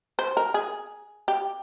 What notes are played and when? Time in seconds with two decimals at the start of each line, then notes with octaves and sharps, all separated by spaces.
0.19 C5
0.37 A#4
0.54 G#4
1.28 G4